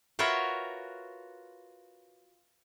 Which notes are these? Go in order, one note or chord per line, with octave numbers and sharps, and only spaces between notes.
F4 F#4 A#4 B4 C#5 E5